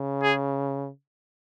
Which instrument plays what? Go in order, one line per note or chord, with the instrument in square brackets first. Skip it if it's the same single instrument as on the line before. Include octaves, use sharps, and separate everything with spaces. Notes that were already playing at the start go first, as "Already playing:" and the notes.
Already playing: [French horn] C#3
[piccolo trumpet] G#4